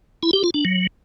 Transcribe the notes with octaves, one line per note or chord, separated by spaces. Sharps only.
E4
G4
F4
D4
F#3